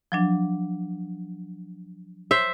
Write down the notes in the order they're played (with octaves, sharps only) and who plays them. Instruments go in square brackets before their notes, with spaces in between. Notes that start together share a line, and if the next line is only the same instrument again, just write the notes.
[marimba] F3 F#3 D4
[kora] C5 E5